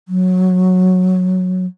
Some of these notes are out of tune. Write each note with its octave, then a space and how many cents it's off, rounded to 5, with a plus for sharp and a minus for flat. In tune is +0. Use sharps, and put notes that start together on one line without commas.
F#3 -10